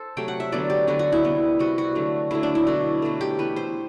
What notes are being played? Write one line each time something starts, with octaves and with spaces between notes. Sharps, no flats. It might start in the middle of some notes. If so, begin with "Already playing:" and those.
Already playing: A4 C5
C3 F#3 A3 G5
F#5
E5
D3 F#3 B3 D5
G4
D3 F#3 B3 F#4
F#4
E4
C3 G3 B3
C3 G3 B3 F#4
F#4
D3 F#3 A3
D3 F#3 A3 E4
D4
E4
B2 F#3 A3 F#4
B2 F#3 A3
G4
E3 B3 B4
C5